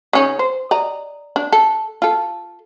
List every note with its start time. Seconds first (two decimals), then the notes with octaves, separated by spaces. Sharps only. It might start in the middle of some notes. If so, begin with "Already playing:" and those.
0.13 C#3 C#4 D#4
0.39 C5
0.71 D5 D#5 A#5
1.36 D4
1.52 A4
2.02 F4 A4